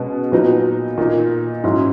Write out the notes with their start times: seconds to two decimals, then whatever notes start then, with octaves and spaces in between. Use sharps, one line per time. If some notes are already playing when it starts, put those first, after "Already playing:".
Already playing: B2 G#3 C#4
0.32 A#2 F#3 B3 D#4
0.98 A#2 A#3 D#4
1.64 G#2 F#3 C#4 E4